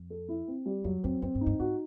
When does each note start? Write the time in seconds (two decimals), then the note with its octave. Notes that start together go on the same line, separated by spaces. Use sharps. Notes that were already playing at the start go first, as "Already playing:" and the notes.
Already playing: F2
0.10 A4
0.28 E4
0.48 C4
0.66 G3
0.84 F2 F#3
1.03 F2 C4
1.22 F#2 C4
1.35 G2
1.41 D#4
1.46 G2
1.60 G#2 F#4